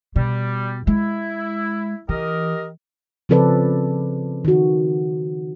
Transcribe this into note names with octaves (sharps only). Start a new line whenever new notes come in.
B2 G3
G#3 E4
E3 G4 A#4 D#5
C#3 F3 C4 A4 B4 D5
D#3 F#4